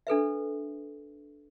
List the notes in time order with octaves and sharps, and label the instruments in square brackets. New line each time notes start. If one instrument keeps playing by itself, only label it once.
[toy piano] D4 A4 B4 E5